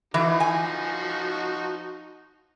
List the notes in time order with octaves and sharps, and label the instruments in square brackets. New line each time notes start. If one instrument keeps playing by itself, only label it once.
[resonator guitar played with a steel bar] E3 [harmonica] F3 D#4 F#4
[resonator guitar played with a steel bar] G#5